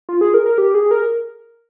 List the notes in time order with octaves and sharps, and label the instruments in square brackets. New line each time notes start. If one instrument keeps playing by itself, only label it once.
[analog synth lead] F4
G#4
A#4
A#4
G4
G#4
A#4